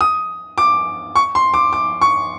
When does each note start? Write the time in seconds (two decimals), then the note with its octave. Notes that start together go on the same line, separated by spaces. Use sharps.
0.01 D#6
0.58 D6
1.15 C#6
1.35 C6
1.54 D6
1.73 D6
2.01 C#6